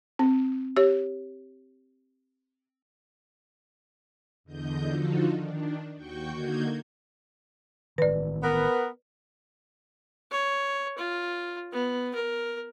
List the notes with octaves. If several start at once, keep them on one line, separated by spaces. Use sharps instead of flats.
C4
G4 C#5
E2 D3 D#5 G6
D3 F3 D#4 F4 F#4 A4
D#3 D4
D#2 F#4 G5 C#6 G6
D3 A#3 D#4 F#4 G6 G#6
A1 D#3 B4 D5
B3 A#4
C#5
F4
B3
A#4